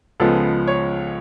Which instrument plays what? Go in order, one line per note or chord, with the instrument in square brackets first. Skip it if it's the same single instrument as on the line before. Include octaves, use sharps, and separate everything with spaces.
[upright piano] C#2 C#3 F3 G#3 B3 A4
C#5